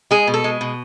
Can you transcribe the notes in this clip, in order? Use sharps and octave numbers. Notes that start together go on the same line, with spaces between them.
G#3 G#4
B2
A4
G#3
B2